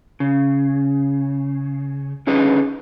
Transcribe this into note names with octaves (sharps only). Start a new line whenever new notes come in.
C#3
D3 C#4 D#4 G#4 B4